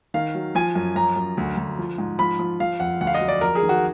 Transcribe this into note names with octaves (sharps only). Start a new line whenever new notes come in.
D#3 F5
F#3
F3 G#5
F#2
F#2 A#5
F#2
D2
D2
F3
G#2
F3 B5
F3
F3 F5
F2 F#5
D2 F#5
F5
D#5
F#3
D5
F2 A#4
G#4
D#3
F#4